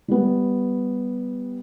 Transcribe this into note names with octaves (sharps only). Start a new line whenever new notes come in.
G3 B3